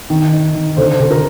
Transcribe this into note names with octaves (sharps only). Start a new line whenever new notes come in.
D#3
D#4
D#3
D3 C5
D3
A#4